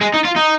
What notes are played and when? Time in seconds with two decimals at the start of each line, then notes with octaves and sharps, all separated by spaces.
0.01 G#3
0.14 D#4
0.25 F4
0.36 D#4